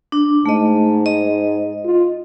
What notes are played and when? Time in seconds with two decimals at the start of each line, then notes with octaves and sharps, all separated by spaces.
0.12 D4
0.46 G#2 A3 D#5
1.06 D#5
1.85 F4